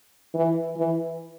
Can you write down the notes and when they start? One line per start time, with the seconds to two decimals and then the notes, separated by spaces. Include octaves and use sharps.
0.34 E3
0.76 E3